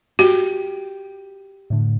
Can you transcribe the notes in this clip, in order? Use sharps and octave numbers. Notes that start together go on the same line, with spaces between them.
F#4 G4
A2 D3